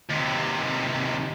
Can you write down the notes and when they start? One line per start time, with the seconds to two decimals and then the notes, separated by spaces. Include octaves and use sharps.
0.09 D#2 C3